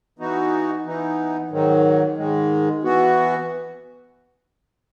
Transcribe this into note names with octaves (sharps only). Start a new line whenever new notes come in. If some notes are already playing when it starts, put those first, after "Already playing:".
E3 B3 D#4 F#4
E3 B3 D#4
G#2 D#3 F#3
G#2 D#3 G#3
E3 B3 F#4